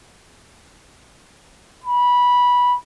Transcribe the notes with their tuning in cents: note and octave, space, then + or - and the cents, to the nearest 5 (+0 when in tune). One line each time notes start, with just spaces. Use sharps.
B5 -15